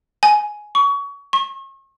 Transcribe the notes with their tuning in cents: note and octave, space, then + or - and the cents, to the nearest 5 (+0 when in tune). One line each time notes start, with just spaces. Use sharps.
G#5 +10
C#6 +30
C#6 -40